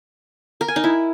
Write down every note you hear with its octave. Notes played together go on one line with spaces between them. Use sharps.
A#4
G#5
D#4
E4